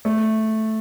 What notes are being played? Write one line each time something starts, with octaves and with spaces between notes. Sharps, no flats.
A3